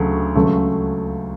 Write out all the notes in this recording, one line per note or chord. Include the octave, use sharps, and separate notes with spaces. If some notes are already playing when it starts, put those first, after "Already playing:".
Already playing: D2 C#3 F#3 A3
C#2 C#3 F#3 A3